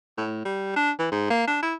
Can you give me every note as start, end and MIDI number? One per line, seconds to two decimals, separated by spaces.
0.18 0.43 45
0.46 0.73 55
0.76 0.91 62
0.99 1.08 52
1.12 1.30 44
1.31 1.46 58
1.47 1.58 62
1.63 1.75 64